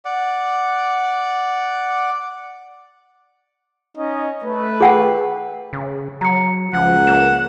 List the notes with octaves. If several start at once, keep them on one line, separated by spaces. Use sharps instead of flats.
D5 F#5
C#4 D#4 D#5
A3 B4
G#4 F#5 G5
C#3
F#3 A#5 C#7
C#2 F3 F#5
A#3 E7